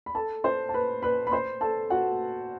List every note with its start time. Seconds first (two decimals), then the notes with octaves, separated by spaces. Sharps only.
0.06 B5
0.15 A4 A5
0.44 C5 C6
0.69 A5
0.74 B4 B5
1.02 B4 B5
1.27 B5
1.32 C5 C6
1.61 A4 A5
1.90 F#4 F#5